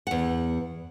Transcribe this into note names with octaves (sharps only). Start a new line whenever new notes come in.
E2 F#5